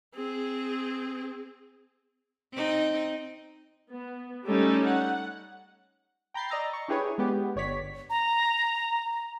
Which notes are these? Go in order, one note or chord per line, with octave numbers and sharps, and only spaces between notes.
C4 G#4
C4 D#4
B3
G3 A3 C#4 D#4 A4
F#5
G5 A#5 B5 G6 A6 C7
D5 D#5 A#5 E6 A6
C#6
D4 E4 G4 G#4 B4 C#5
G#3 B3 G4
G1 C#5 D5 B6
A#5